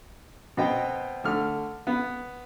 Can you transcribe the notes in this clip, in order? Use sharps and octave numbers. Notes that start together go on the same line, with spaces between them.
B2 B3 C4 D#5 G5
D3 A3 F6
B3